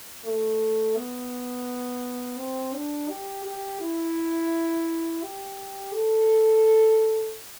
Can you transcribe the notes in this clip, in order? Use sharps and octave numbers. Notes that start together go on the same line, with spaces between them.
A3
B3
C4
D4
G4
G4
E4
G4
A4